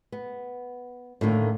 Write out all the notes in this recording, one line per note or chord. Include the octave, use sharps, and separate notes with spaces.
B3
A2 D3 D#3 A#3